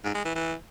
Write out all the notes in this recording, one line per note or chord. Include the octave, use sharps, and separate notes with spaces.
G#2
G#3
E3
E3